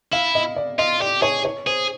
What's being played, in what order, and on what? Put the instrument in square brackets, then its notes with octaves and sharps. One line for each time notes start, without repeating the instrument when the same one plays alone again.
[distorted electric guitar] E4 [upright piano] F5
[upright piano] D#5
D5
[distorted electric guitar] F4 [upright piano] D#5
[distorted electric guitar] G4 [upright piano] D5
[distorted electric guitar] G#4 [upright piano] C#5
[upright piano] C#5
[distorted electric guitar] G#4 [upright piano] C5